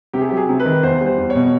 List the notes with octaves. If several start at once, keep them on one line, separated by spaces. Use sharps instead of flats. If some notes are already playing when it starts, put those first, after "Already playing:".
C3 G4
G#4
F#3 G4
G#4
C3
B4
D#3
E2 C5
G3
C5
E2
C#5
B2